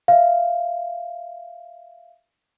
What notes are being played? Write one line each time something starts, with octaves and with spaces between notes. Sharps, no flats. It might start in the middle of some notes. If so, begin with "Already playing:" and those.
E5 F5